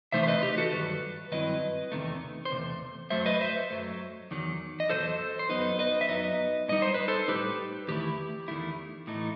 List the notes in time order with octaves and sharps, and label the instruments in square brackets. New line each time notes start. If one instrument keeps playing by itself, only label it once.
[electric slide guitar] C3 E3 A3 D#4 C5 E5
C5
B4 D#5
G4
F#4 A4
G2 D#3 F#3 B4
G2 D#3 F#3 C4 E4 B4 D#5
E2 C3 D#3 A3
C5
E2 C3 A3
F#2 F#3 A3 C5 E5
B4 D#5
C5 E5
F#2 F#3 A3
E2 D#3 F#3
D#5
E2 D#3 F#3 A4 C5
C5
F#2 F#3 B3 D#4 B4 D#5
B4 D#5
E5
F#2 F#3 B3 D#4 B4 D#5
A2 G3 D#4 D#5
C5
B4
A4 C5
A2 G3 D#4 G4 B4
E2 D#3 A3 E4 G4
E2 D#3 A3 E4
A2 E3 A3 D#4